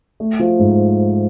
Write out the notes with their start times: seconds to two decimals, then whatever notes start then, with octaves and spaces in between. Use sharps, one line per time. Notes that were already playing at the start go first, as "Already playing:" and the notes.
0.20 A3
0.39 F3
0.59 G#2